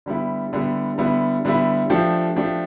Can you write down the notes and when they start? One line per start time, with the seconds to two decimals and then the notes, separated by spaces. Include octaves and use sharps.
0.06 D3 G3 B3 E4
0.53 D3 G3 B3 E4
0.98 D3 G3 B3 E4
1.45 D3 G3 B3 E4
1.90 F3 A3 D4 G4
2.36 F3 A3 D4 G4